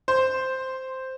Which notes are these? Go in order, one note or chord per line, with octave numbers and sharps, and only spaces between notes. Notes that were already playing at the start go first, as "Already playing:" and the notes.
C5